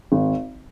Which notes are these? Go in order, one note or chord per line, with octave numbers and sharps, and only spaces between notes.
G#1